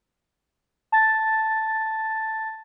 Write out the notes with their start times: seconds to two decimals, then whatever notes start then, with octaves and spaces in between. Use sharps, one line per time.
0.92 A5 A6